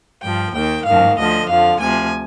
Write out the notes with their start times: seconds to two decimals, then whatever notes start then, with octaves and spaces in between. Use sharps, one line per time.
0.22 G2 F3 G5
0.53 D#2 D#3 G5
0.85 G#2 D#3 F5
1.17 D2 D3 F3 D#5
1.48 F2 D3 F3 F5
1.79 D2 C3 F3 G#5